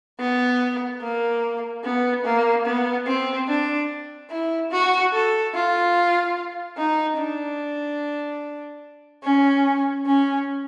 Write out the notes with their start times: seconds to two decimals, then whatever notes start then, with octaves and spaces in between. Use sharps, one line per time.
0.20 B3
1.02 A#3
1.84 B3
2.25 A#3
2.66 B3
3.07 C4
3.48 D4
4.30 E4
4.71 F#4
5.13 A4
5.54 F4
6.77 D#4
7.18 D4
9.23 C#4
10.06 C#4